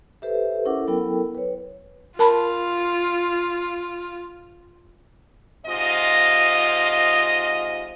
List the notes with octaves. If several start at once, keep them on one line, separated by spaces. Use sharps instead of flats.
G4 A4 B4 C5 E5
C#4 E4 A4 A#4 F#5 D6
F#3 B3 E4 A4 A#4 G5
B4 C#5
F4 A#4 A5 B5
G#2 C3 F4 D#5